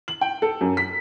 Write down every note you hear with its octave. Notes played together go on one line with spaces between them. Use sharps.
F#7
G5
A4
F#2
B6